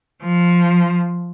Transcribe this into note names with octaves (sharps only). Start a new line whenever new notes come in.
F3